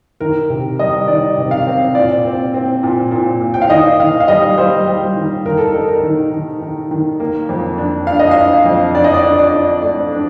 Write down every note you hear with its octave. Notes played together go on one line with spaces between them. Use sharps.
D#3 A#4
C3
G3 D#5
D#3 D5
C3
F5
C4
A#2 D5
C4
C4
A#2
A#2
A#2
G5
F5
D#3 D#5
D#3 F5
F5
G3 D#5
G3 C5
G3
D#3
D#3 A#4
A4
A#4
D#4
A#4
D#3
D#3
D#3
D#3
A#3
F2
D4
D4 F5
D#5
F5
D4
F2
D4 D5
D#5
D5
D4
D5
D4
A3 D5
D4